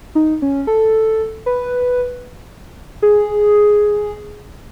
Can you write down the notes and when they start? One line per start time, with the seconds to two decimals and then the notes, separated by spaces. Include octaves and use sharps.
0.15 D#4
0.42 C#4
0.67 A4
1.46 B4
3.02 G#4